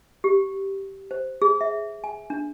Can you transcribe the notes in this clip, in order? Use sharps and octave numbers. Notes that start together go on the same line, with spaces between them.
G4
C5
G#4
E5
G#5
D4